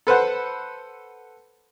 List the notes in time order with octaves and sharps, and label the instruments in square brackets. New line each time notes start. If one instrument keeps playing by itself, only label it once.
[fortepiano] A4 B4 C5 F#5